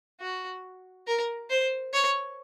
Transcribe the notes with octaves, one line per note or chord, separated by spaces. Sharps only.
F#4
A#4
C5
C#5